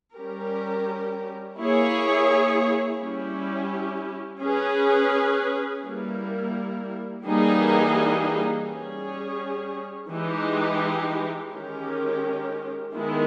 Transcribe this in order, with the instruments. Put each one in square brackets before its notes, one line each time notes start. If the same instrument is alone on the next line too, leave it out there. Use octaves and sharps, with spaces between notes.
[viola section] G3 C#4 G4 A#4
A#3 E4 G#4 C#5
G3 C#4 E4 G4
C#4 G#4 B4
G3 A#3 E4 A#4
E3 G3 A#3 D#4 G#4
G3 C#4 G#4 C#5
E3 G#3 D#4 G4
D#3 G#3 C#4 G4 A#4
D#3 G#3 B3 E4